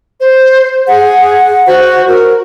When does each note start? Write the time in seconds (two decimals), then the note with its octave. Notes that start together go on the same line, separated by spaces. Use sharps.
0.20 C5
0.88 G#4 F#5
1.67 F#4 C5
2.08 F#4 A#4